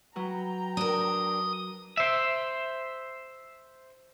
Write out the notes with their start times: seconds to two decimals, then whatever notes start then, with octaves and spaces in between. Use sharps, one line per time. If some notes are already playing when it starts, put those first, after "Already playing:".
0.16 F#3 B4 G5 A#5
0.77 D4 A#4 D#6
1.97 C5 E5